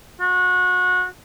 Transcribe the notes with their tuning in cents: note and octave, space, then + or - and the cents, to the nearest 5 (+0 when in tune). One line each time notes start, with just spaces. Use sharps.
F#4 -25